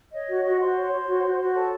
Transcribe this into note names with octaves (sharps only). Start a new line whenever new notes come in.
C#5 D#5
F#4
F#4
F#4 C5 C6
C#5
C#5
F#4
F#4
F#4
A4 C#5 A5